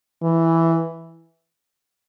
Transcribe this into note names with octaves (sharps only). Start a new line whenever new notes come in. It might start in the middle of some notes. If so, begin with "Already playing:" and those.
E3